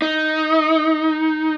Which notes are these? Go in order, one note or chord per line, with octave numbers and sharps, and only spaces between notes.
D#4